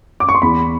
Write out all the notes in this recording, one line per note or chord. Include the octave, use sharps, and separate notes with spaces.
D6
C#6
C6
E2 B5